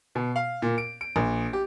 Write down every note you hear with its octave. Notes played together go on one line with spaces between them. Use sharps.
B2
F5
A#2
D7
D7
A#1
G4